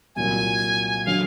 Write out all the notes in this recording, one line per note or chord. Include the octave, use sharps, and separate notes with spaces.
C2 A#2 F#3 G#5
D3 F#3 F5